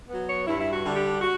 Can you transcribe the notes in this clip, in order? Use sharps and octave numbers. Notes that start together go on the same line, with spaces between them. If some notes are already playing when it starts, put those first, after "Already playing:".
F#3 B3
C#5
G2 E4
E4
F#4
D3 G3 D4
G4
F#4